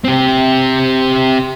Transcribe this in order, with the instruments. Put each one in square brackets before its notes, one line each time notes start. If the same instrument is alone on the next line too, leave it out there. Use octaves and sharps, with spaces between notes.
[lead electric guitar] C4 G4